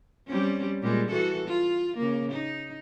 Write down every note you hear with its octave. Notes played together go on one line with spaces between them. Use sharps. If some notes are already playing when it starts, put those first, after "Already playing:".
G3 C4 C#4
A#2 G3 G#3
E3 F#4 A4
F4
C#3 A#3
D#4